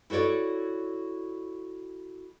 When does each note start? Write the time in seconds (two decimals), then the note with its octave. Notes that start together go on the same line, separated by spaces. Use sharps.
0.10 E4 F#4 A4 C#5 D5